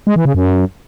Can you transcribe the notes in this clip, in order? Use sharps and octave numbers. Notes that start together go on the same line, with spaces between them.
G#3
E3
C#3
F#2